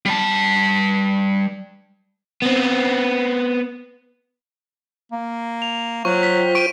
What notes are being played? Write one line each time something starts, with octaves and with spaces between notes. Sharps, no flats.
G3 A5
B3 C4
A#3
F7
F#3 F4 C5 G5 C#6
B6
C#6 D7 D#7